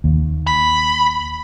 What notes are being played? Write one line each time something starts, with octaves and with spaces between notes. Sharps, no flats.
D#2
B5